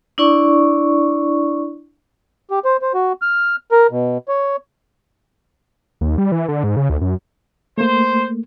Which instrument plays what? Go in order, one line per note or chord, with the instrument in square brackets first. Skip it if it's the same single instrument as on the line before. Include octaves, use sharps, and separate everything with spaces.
[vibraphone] D4 E4 D5 C#6
[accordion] G4
C5
C5
F#4
F6
A#4
B2
C#5
[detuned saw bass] D#2
G3
E3
D3
G#2
C#3
D2
F#2
[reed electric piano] A3 A#3 [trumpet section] C5